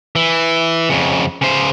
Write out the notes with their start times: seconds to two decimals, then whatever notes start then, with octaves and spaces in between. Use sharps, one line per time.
0.16 E3
0.90 F2 C#3
1.42 C#3 C5